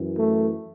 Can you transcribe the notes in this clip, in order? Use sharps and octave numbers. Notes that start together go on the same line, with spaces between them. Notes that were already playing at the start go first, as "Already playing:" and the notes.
Already playing: F#2 E3
A3